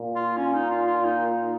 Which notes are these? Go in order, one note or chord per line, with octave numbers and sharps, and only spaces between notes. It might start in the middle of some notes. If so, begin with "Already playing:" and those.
Already playing: A#2
F4
C#4
D#4
F4
F4
D#4
D#4